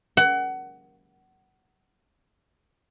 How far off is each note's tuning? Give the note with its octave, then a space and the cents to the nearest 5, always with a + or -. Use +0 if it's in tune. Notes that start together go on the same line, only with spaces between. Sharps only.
F#5 +25